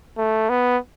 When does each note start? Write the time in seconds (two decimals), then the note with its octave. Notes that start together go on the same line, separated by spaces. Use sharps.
0.18 A3
0.49 B3